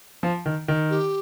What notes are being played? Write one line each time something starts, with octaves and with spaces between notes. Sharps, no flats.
F3
D#3
D#3
G4